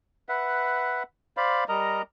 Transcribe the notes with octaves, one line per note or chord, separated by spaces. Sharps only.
B4 E5 F#5
C5 D5 F5 B5
G3 A#4 D#5 A#5